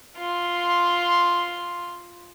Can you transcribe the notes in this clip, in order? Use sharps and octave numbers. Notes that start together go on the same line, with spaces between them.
F4 C6